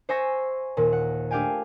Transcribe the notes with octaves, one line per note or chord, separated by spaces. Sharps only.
C5 E5 G#5 C#6 E6 A#6
D#2 A#2
F#5
A3 D4 G4 F5 G5 G#5